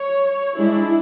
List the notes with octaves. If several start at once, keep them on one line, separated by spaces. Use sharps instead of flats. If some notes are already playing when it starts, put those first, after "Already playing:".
Already playing: C#5
G#3 D4 E4